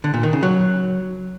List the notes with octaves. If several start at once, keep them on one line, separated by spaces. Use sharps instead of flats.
D3
A#2
D#3
C#3
F#3